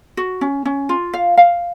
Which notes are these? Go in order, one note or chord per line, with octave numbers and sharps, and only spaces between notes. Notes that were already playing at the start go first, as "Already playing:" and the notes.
F#4
C#4
C#4
F4
F5
F5